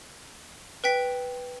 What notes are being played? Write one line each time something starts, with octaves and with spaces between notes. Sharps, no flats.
B4 G5 B6